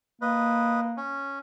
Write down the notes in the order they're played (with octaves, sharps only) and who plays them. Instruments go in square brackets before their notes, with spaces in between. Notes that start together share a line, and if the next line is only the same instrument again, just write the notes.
[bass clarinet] A#3 [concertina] B4 D#5
[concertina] C#4